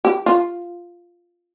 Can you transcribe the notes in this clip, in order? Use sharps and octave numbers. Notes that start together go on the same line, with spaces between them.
G4
F4